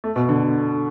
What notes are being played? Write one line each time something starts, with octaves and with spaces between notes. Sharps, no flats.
A3
B2
D3